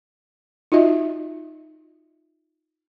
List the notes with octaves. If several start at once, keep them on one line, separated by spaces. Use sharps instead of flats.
D#4 F4 F#4 D#5 E5